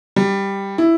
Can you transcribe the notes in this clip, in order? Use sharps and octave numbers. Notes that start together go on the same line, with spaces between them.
G3
E4